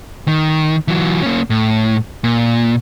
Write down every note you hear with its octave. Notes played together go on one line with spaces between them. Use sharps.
D#3
E3 F#3
A#3 C#4
A2
A#2